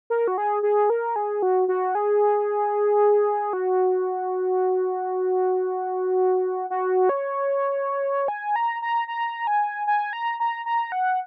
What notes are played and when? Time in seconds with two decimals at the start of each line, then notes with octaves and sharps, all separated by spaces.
0.10 A#4
0.28 F#4
0.38 G#4
0.63 G#4
0.90 A#4
1.16 G#4
1.43 F#4
1.68 F#4
1.95 G#4
3.53 F#4
6.70 F#4
7.09 C#5
8.28 G#5
8.56 A#5
8.82 A#5
9.08 A#5
9.47 G#5
9.87 G#5
10.13 A#5
10.40 A#5
10.66 A#5
10.92 F#5